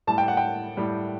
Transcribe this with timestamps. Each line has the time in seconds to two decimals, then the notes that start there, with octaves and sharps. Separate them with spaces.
0.07 A2 G3 A5
0.18 G5
0.28 F#5
0.37 G5
0.77 A2 G3